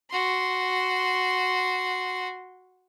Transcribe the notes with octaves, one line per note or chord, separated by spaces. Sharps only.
F#4 C6